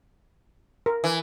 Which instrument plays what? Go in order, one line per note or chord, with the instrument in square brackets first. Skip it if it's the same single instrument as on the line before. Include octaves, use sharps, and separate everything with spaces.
[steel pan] A#4
[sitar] E3